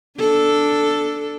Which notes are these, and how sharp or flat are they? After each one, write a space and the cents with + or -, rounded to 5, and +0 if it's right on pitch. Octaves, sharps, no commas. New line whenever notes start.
D4 +0 A4 +0